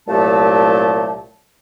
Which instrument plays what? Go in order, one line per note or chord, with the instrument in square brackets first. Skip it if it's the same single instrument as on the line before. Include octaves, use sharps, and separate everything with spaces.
[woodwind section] C2 A#2 F#3 A3 G4 A5